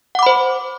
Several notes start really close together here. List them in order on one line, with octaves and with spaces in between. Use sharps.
F#5 D6 B5 C5